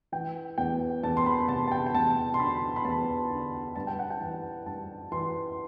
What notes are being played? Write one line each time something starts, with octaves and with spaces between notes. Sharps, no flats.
E3 G5
E2 G5
E2 A5
C6
B5
C3 A5
A5
G5
G5
E2 A5
C6
D3 B5
B5
E2 A5
D3
G2 A5
G5
F#5
G5
E3
G2 A5
E3 C6